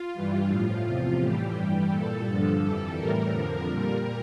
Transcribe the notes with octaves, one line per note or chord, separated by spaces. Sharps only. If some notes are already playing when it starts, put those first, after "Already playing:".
Already playing: F4
G2 E3 G3
A2 F3
E2 C3 F3 F4
A2 E3 G3 G4
G2 E3 G3
A#2 G3 A4
G2 D3 F3
F2 E3 G3
A2 E3 G3 A#4
F2 D3 F3
A#2 G3